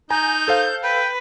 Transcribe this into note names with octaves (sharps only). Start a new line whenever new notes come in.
D#4 G#5 A#5 G6
A4 C5 F5
B4 G5